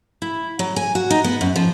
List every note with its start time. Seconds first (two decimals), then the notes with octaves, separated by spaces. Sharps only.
0.22 E4
0.59 F#3
0.76 G#5
0.95 F#4
1.10 D#4
1.24 B3
1.41 F#2
1.56 F3